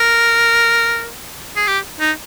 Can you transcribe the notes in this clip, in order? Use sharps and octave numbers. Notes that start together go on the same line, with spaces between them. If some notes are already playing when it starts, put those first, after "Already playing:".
Already playing: A#4
G#4
G4
D#4